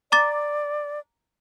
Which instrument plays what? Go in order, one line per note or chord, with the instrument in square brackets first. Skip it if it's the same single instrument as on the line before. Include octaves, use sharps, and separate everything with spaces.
[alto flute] D5 [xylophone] A#5 D6 A6